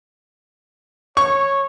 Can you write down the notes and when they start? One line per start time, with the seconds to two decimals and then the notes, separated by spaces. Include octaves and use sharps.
1.17 C#5 C#6